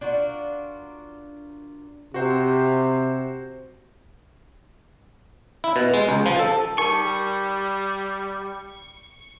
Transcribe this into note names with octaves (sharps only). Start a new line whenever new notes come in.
D4 F4 F#4 A#4
C3 F#4 C5
E4
B2
G#3
C#2
F3
A4
G3 D#4 A#4 A5 C#6